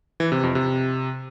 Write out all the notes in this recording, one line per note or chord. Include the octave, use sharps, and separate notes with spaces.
E3
C3
F2
C3